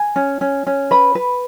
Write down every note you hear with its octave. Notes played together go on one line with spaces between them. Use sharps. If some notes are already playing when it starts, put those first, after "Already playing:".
Already playing: G#5
C#4
C#4
C#4
B4 B5
B4